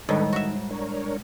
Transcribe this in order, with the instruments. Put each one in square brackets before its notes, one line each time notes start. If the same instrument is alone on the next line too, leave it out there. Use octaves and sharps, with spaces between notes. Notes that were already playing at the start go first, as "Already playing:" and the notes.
[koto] A2 D#3 [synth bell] G3 G#3 [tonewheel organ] D4 A4 B4
[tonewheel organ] D#3 [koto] F#4 E5
[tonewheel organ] D4 A#4 C#5